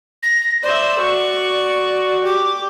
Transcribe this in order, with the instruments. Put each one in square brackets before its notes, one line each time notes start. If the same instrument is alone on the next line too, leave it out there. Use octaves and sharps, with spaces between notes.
[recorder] A#6
[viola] C5 E5 [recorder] D5
[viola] F#4 C#6
[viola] G4 [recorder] D6